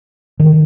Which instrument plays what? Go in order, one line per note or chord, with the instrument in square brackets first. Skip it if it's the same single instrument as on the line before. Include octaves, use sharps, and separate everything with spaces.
[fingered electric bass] D#3